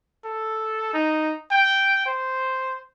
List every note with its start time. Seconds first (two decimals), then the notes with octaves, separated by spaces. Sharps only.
0.25 A4
0.94 D#4
1.52 G5
2.06 C5